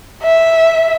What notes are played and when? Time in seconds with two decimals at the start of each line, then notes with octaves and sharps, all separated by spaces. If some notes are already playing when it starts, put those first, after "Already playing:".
0.23 E5